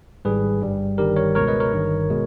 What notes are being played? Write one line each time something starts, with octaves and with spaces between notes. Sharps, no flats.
G#1 G#2 G3 G#4 B4
G1 G2 G3
G1 G2 D#3 G3 G4 A#4
A#4 C#5
C#2 B2 G#3 A#4 C#5
B4 D#5
A#4 C#5
G1 G2 D#3
B2 G#3